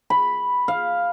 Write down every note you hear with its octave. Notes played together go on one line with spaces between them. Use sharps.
B5
F5